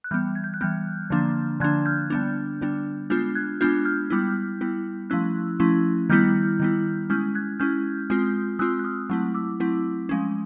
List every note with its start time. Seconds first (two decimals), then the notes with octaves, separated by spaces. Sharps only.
0.04 F#6
0.11 E3 G3 B3 F6 G6
0.35 G#6
0.44 G6
0.54 F#6
0.61 E3 G3 B3 F6 G6
1.10 D3 F3 A#3 D4
1.60 D3 F3 A#3 D4 F#6 G#6
1.86 F6 G6
2.10 D3 G3 B3 D4
2.61 D3 G3 B3 D4
3.10 G#3 B3 D4 F4 F6 G6
3.35 F#6 G#6
3.61 G#3 B3 D4 F4 F6 G6
3.85 F6 G6
4.10 G3 B3 E4
4.61 G3 B3 E4
5.10 F3 A3 C#4 E4 E6 F#6
5.60 F3 A3 C#4 E4
6.10 D#3 G3 B3 E4 F6 G6
6.60 D#3 G3 B3 E4
7.10 G#3 C#4 E4 F6 G6
7.35 F#6 G#6
7.60 G#3 C#4 E4 F6 G6
8.10 G#3 C4 F4
8.59 G#3 C4 F4 E6 F#6
8.79 F#6
8.84 D#6 F6
9.10 F#3 A3 C4 E4
9.35 D6 E6
9.60 F#3 A3 C4 E4
10.09 F3 G#3 C#4